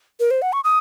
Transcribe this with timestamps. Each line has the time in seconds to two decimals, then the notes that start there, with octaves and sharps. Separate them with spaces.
0.20 A#4
0.31 C5
0.42 F#5
0.53 C#6
0.64 D#6